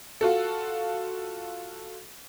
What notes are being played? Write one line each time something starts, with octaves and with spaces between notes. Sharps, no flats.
F4 F#4 A4